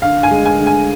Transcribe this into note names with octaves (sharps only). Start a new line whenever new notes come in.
D3 F5
G#5
G#3
G#5
D3
G#5